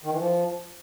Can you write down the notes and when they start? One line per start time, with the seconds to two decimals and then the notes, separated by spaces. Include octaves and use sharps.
0.04 D#3
0.11 E3
0.18 F3